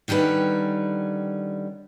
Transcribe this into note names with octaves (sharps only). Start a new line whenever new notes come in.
D3 D#3 G3 C#4 B4